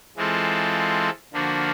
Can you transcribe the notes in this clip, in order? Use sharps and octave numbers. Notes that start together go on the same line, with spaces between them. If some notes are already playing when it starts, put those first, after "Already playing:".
E3 G#3 C4 F4 A4
D3 F3 A#3 D4 F#4